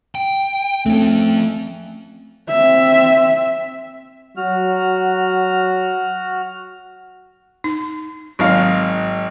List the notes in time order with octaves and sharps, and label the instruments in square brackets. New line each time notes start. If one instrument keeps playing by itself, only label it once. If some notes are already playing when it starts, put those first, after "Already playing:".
[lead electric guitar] G5
[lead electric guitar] F3 C4 [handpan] A3 C#4
[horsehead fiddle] C4 E5
[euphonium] F#3 [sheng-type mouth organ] F#4 F6
[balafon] D#4
[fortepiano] G#1 G#2 F5 [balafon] F#3